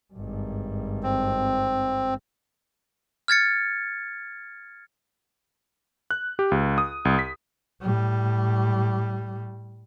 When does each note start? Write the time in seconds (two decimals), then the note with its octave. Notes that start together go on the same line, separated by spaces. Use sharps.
0.14 G#1 G2
1.03 C4
3.28 F6 G#6 A6 C#7
6.11 F#6
6.39 G4
6.51 C#2
6.78 D#6
7.05 C2
7.19 B6
7.82 A2 G3